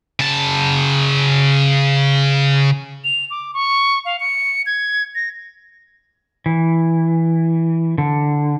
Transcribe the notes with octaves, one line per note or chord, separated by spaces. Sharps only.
C#3 A5
F7
D6
C#6
F5
C#7
G#6
A#6
E3
D3